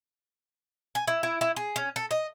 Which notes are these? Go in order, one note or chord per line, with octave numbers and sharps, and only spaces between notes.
G#5
E4
E4
E4
G#4
C#4
A4
D#5